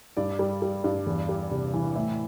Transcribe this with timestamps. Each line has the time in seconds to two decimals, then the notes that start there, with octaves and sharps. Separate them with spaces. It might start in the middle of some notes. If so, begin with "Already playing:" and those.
0.17 G2 D5
0.39 G3
0.62 G3
0.84 G2
1.06 E2
1.29 G3
1.51 C3
1.74 E3
1.95 A2 E5